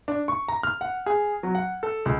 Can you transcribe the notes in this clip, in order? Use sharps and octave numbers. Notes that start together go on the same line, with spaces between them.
D4
C#6
A#5
F6
F#5
G#4
F#3
F#5
A4
C#2